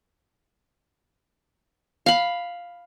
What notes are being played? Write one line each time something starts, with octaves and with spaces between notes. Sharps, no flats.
F5 B5